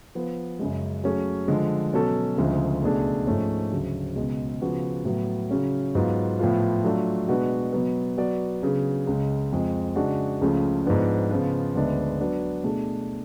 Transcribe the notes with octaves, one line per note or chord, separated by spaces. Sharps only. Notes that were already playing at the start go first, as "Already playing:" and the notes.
F3 B3 F4 B4
F#2 C#3 G#3
F#3 A3 C#4 G#4
D3 F3 G#3
B2 F#3 C#4 F#4 A4
D2 C#3 F3 G#3
C#2 B2 A3 D4 G#4
G#2 F3 A3 C#4
D2 C#3 F#3
C#2 B2 G#3
C#3 F3 B3 F#4
A2 F#3 B3
C#3 F#3 C#4
G#2 F#3 B3 F4
A2 F3 B3 F4
F#3 A3 D4 F4
B2 G#3 D4 F#4 B4
B2 F#3 B3
F#3 B3 F#4 B4 D5
C#3 F#3 B3 D4 G#4
C#2 C#3 G#3
F2 F3 G#3
C#3 G#3 D4 F#4
C#2 C#3 F3 A3
G#2 F3 B3 D4
C#3 F3 B3 F4
D2 C#3 G#3 B3 D4
F#3 B3 D4
B2 A3 D4 G#4